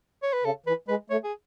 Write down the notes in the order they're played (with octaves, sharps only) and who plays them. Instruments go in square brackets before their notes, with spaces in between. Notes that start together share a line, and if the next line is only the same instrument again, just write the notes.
[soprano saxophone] C#5
B4
[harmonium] C#3 [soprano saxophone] A4
[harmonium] E3 [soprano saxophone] B4
[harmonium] G#3 [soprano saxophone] B4
[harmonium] A3 [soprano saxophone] C#5
[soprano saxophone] G#4